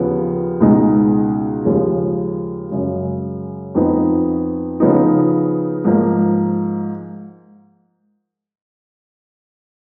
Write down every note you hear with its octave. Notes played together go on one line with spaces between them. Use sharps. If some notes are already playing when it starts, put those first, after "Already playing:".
Already playing: D#2 C#3 F3 B3
C#2 B2 G#3 D#4
D#2 C#3 F3 G#3
F#2 C#3 G#3
F2 F3 B3 D#4
C#3 F3 B3 D#4
G#2 F3 A#3